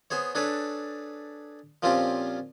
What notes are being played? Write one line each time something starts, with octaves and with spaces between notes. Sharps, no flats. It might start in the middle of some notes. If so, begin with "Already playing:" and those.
B3 G#4 C5 C#5
D4 G#4 A4 B4 C#5
A#2 F3 C4 C#4 F4 G4